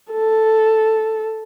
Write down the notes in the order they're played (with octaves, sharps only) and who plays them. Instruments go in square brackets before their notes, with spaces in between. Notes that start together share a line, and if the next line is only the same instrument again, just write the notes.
[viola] A4